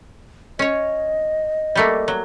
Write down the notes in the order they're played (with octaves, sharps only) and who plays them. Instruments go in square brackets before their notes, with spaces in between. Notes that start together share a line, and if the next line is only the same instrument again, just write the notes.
[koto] C#4 C#5 [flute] D#5
[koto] G3 A3 A#3
F#3